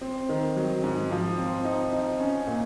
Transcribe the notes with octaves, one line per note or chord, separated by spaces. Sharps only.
C4
D#3
F#3
G#2
F3
C4
D#4
D#4
C#4
A#2